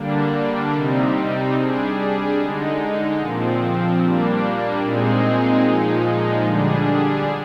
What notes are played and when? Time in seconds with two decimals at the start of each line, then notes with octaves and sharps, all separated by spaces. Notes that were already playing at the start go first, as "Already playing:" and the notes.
Already playing: D3 G3 A#3 D4
0.74 C3 G3 C4 D#4
1.56 G3 D4 G#4
2.38 D3 G#3 D#4
3.20 A#2 F3 C4
4.01 G3 A#3 D4
4.83 A#2 G#3 C4 D#4 G#4
5.65 A#2 F3 G#3 D#4
6.46 D3 G3 D4 G#4